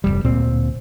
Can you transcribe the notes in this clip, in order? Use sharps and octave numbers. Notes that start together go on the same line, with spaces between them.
F1 C2 G3
D1 A#2 C4